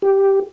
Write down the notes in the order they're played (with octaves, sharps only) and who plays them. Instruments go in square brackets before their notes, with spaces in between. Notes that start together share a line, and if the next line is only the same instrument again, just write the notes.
[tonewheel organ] G4